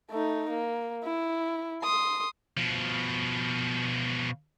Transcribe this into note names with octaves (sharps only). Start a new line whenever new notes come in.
A3 D#4
A#3
E4
C6 D#6
B2 F3